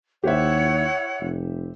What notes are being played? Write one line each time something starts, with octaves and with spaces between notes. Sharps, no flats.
D#2 E4 G4 C5 C#5 E5 F#5
F1